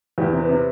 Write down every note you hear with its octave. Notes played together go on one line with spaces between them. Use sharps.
E2 G4
C3
B4
C3